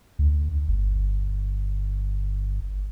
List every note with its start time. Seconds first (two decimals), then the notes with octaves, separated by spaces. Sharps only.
0.19 D2
0.68 G1